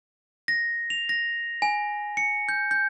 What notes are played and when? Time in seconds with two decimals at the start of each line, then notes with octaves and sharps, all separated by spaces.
0.48 A#6
0.90 F7
1.09 A#6
1.62 G#5
2.17 C#7
2.49 G6
2.71 G6